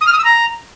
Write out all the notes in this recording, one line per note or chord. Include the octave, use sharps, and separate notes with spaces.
D#6
F6
D#6
E6
A#5